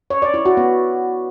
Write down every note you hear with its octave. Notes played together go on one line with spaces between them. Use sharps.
C#5
D5
E4
F#4
B3